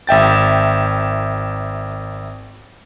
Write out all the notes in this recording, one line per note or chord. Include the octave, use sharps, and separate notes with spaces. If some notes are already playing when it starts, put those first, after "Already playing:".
G#1 E5 G5 A6